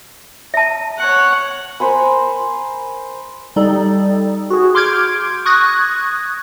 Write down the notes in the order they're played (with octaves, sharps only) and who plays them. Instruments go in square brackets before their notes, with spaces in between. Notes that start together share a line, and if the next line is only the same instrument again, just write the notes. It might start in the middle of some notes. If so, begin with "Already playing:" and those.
[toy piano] E5 A5
[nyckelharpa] C#5 F#5
[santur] A#4 C5 G#5 B5
[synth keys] G3 D#4 A4
F#4 G#4
C6 D6 F6 G6 G#6 D7
C#6 D#6 F#6 G#6 A#6